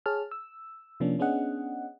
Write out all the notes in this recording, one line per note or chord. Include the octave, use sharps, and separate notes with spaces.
G#4 C#5 A5 F6
E6
C3 F3 A#3 C#4 D4
B3 C#4 D4 G#4 D#5 F#5